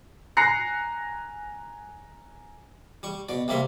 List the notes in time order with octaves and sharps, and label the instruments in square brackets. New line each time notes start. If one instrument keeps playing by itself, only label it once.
[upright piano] G#5 A#5 F#6 A#6 C7 C#7
[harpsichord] G3 C#6
B2 D5
C3 G3 A#3 E5 C6